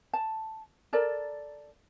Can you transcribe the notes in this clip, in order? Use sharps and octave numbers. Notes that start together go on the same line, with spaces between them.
A5
A4 A#4 D5